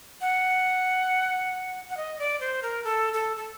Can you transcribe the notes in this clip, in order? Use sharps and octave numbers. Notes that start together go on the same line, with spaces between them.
F#5
F#5
D#5
D5
C5
A#4
A4
A4
A4